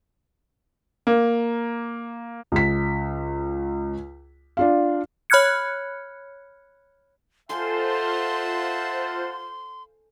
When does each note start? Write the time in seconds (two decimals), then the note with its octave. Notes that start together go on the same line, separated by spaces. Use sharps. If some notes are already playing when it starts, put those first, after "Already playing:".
1.07 A#3
2.52 C#2 B6
4.57 D4 F4 F5
5.30 C#5 B5 F6 F#6 G#6 C#7
7.49 F4 A4 C5 E5 F#5 G#5 A5 C6